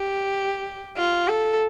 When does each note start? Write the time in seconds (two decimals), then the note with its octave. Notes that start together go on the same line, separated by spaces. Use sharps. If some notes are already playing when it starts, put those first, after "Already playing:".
Already playing: G4
0.97 F4
1.28 A4